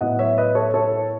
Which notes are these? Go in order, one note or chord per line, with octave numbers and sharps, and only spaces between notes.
A2 F#3 B3 D#5 F#5
C#5 E5
B4 D#5
A4 C#5
A4 C#5